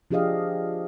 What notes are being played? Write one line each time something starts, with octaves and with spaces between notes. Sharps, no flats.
F3 D4 G4 G#4 D#5 F5